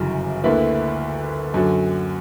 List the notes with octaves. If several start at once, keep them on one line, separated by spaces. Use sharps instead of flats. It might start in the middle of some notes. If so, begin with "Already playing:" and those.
Already playing: G1 F#2 C#3 E3
D2 D3 A#3 E4 B4
F#2 D3 F#3